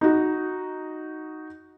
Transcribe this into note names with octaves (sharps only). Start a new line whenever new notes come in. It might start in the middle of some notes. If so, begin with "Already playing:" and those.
D#4 F#4